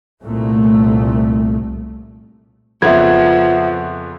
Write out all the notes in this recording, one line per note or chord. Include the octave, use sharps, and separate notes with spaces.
C2 A#2 A3
F2 C#3 F3 B3 E5 F#5 G#6